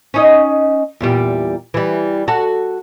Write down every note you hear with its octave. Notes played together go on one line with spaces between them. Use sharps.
C#4 D#4 D#5
E2 A#2 G3
E3 G3
F#4 A4